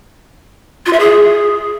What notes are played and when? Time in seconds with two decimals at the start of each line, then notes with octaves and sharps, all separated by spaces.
0.86 F4
0.93 E5
1.00 G#4